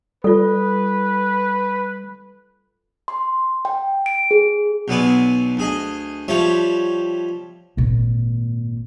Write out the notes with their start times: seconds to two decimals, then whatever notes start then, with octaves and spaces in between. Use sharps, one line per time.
0.24 G3 F4 A4 B4
3.08 C6
3.65 G5
4.06 D7
4.31 G#4
4.88 B1 B2 F#3 B3 D5 G#5
5.57 D2 G#4 D#5
6.28 F3 G3 C#5 E5 A5
7.77 G#1 A#2